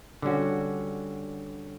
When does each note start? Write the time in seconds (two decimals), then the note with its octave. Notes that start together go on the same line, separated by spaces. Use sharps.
0.22 D3 G3 C#4 F#4